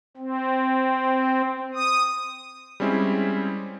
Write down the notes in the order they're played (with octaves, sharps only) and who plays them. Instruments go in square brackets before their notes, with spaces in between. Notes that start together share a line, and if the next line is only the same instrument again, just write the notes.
[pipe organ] C4
D#6
[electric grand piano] G3 G#3 C4 C#4 E4 G#4